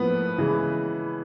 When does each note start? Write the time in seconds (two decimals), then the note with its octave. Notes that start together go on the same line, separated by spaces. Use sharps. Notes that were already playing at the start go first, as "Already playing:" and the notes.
Already playing: A2 F3 A#3 B3 B4
0.38 C#3 E3 G#3